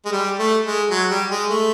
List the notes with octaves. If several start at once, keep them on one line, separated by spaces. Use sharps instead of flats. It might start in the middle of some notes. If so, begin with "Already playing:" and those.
G#3
G3
A3
G#3
F#3
G3
G#3
A3